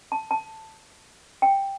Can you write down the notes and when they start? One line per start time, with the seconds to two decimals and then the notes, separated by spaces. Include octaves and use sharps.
0.12 A5
0.31 A5
1.42 G5